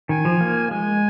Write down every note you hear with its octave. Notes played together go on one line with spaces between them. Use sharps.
D#3 G#5
F3
A#3
G#3 G#5